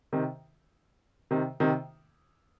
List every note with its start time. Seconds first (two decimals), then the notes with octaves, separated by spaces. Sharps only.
0.13 C3 D#3
1.31 C3 D#3
1.60 C3 D#3